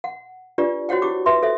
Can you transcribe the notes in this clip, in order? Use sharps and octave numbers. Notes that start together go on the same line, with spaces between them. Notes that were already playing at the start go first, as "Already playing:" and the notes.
F#5
D4 F4 G4 B4 D5
F#4 C5 C#5 F#5 G5
E4 G4 D6
B4 E5 C6
A4 C5 E5